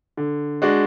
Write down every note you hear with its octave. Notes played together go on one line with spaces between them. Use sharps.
D3
G#3 D4 F#4